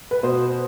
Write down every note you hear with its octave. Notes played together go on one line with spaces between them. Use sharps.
B4
B2 B3 C5